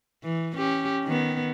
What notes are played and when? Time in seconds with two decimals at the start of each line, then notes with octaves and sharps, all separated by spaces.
0.23 E3
0.57 C#4 G4
1.04 D#3 B3